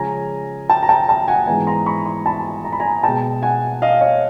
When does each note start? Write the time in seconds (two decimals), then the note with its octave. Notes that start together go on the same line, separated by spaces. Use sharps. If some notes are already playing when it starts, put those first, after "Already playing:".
Already playing: C#3 F3 G#3 C#4 G#5 A#5
0.70 G5 A5
0.83 A#5
0.89 G5 A5
1.09 G5 A5
1.28 F#5 G#5
1.47 G#2 E3 G#3 B3 G#5 A#5
1.67 A#5 C6
1.86 B5 C#6
2.06 A#5 C6
2.26 A5 B5
2.65 A#5
2.72 B5
2.80 G#5 A#5
3.03 B2 G#3 B3 G5 A5
3.43 F#5 G#5
3.82 D#5 F5
4.01 C#5 D#5